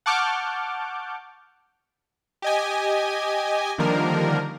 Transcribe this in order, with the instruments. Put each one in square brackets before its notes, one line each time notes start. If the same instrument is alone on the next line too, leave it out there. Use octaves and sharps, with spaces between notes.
[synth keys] F#5 A5 C#6 D6 F6 G6
[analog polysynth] G4 D#5 G#5
D3 D#3 F3 G3 A#3 A#4